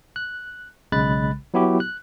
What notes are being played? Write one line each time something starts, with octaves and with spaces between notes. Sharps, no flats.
F#6
B1 C#3 G#3 B5 F#6 A6
F#3 B3 E4 F#4 G4
F#6